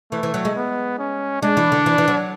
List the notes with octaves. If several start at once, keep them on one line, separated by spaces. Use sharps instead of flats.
E3 A3
E3
F#3
G#3
B3
C#4
G#3 D4
E3
D3
E3
E3
F#3